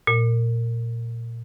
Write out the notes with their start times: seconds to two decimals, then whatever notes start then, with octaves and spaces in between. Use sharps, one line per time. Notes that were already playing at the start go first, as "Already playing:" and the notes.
0.07 A#2